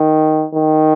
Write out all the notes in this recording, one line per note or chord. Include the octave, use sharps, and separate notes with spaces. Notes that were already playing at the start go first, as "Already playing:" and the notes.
Already playing: D#3
D#3